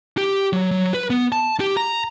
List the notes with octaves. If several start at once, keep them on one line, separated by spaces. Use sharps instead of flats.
G4
F#3
F#3
B4
B3
A5
G4
A#5